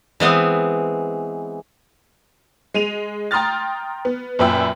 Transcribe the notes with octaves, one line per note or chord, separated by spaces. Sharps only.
E3 G#3 B3 C4
G#3 D#7 F7
G5 A#5 C6 D#6 F6 A6
B3
F#2 A#2 B4 E5 G5 E6